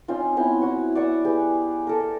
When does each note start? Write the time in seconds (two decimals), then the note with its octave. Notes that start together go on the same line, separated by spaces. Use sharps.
0.08 C4 C#4 D#4 F4
0.37 B3 C4 E4 B5
0.61 F#4 C#5
0.95 D5 F#5 C#6 E6
1.25 G4 G#4 B4
1.87 A4 A#4